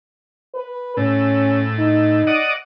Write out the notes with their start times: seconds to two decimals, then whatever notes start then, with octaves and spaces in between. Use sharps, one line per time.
0.54 B4
0.97 A2 C#4
1.79 D#4
2.27 D5 D#5 F#5